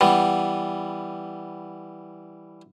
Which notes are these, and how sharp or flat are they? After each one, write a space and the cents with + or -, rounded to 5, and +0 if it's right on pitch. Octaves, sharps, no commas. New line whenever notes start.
E3 +0 G3 +0 B3 +0